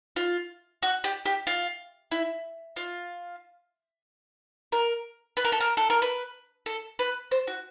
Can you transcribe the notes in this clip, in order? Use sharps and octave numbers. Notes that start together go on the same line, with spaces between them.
F4
F#4
G4
G4
F4
E4
F4
A#4
B4
A#4
A4
A#4
A4
A#4
B4
A4
B4
C5
F#4